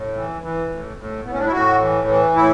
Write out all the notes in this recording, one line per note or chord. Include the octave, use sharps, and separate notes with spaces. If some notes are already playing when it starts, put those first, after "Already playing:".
Already playing: A2
E3
E3
A2
A2
A2 B3
C#4
D4
E4
A2 F#4
E3
E3
A2 E4